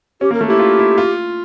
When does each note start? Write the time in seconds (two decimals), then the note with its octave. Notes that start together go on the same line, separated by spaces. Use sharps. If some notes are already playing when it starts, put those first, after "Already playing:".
0.21 C#4 G4
0.31 A#3
0.33 A#4
0.41 A3
0.47 E4 G4
0.59 F4
0.79 E4
0.98 F4